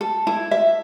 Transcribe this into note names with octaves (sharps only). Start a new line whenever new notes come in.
A4
E4
E5